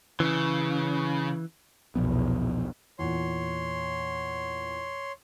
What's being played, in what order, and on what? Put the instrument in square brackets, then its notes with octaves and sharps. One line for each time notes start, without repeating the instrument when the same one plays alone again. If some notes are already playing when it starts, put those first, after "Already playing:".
[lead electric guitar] C#3 [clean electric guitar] E3
[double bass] B1 E2 [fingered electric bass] A#2 F3 B3
[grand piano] E2 A#2 [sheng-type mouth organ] C#5 C6